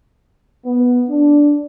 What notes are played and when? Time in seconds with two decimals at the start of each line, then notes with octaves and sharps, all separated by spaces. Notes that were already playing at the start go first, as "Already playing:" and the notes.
0.65 B3
1.08 D4